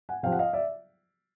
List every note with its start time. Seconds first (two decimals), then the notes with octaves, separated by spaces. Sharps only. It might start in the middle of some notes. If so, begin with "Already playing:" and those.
0.09 F#5 G#5
0.23 C3 F3 F5 G5
0.32 F#5
0.39 D#5 F5
0.53 D5 E5